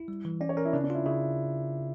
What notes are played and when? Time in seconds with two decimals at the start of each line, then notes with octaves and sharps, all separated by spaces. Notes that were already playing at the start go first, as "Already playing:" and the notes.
Already playing: E4
0.08 G3
0.25 E3
0.41 C#4 D5
0.49 C#5
0.57 C#4 A#4
0.65 E4
0.73 C#3 D4
0.84 D4
0.90 E4 F4
1.06 C#3 E4